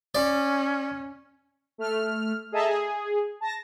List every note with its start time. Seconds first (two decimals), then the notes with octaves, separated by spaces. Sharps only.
0.15 C#4 D5
1.78 A3 F6
2.52 G#4 A4 D#5 E5 A5 A#5
2.68 G#4
3.41 A5 A#6